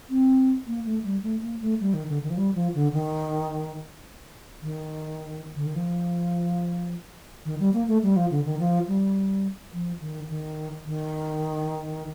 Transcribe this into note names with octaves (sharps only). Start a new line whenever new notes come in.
C4
A#3
A3
G3
A3
A#3
A3
G3
D#3
D3
D#3
F3
G3
F3
D3
D#3
D#3
D3
D#3
F3
D#3
G3
A#3
A3
G3
F3
D3
D#3
F3
G3
F3
D#3
D#3
D#3